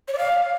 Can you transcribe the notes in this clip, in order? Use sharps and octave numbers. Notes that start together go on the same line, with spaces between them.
C#5
D5
F5